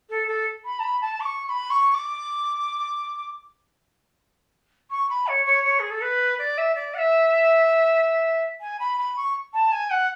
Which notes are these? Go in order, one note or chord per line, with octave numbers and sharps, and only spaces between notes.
A4
A4
B5
A5
B5
A5
D6
C#6
C#6
B5
C#6
D6
C#6
B5
C#5
C#5
C#5
G#4
A4
B4
D5
E5
D5
F#5
E5
G#5
B5
B5
C#6
A5
G#5
F#5